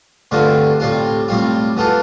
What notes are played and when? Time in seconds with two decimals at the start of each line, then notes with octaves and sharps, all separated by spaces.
0.31 G2 D3 A3 C4 F4
0.80 A2 G3 C4 F4
1.28 A2 G3 C4 F4
1.77 E3 B3 F4 A4